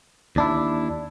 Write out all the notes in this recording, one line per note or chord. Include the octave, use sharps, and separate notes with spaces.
D#2 D4 E4